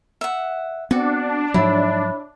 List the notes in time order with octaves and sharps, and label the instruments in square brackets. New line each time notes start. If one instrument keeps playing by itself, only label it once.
[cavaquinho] E5 F#5
[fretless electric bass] B3 C4 [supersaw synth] D4 [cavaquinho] F#4 A4
[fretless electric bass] G#2 F3 F#3 [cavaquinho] E4 [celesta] C#5 E5 B5